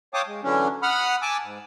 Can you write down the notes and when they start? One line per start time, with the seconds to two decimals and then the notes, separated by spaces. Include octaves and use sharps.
0.14 C#5 F5 G5 A5 D6 D#6
0.27 G#3
0.43 D3 E3 F#3 C#4 D4
0.83 F#5 B5 D#6 F6
1.22 G#5 A5 D6 E6
1.42 G#2